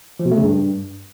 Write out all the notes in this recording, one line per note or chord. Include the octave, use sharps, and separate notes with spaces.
F3
B2
A3
C#3
G2